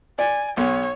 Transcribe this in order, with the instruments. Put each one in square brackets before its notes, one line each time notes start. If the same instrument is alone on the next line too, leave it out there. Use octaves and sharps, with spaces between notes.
[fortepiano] D5 [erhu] G#5
[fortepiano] B1 [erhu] C#5